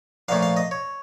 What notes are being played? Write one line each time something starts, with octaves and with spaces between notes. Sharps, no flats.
A#1 A#2 F3 A3 C#4 F5
F5
D#5
C#5